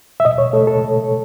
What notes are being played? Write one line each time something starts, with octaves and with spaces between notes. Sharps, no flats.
E5
B2 D#5
C#5
A3 A4
A4